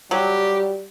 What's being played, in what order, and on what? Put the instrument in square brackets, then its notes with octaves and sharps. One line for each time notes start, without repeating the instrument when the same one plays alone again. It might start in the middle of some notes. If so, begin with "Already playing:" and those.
[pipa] F#3 [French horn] G3 [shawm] G4